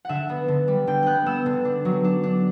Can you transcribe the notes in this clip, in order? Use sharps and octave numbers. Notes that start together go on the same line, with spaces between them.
D3 E5 F#5
B3
D3
G3
D3 G5
B3 F#6 G6
B3 E6
D3
D4
F#3
D4
D4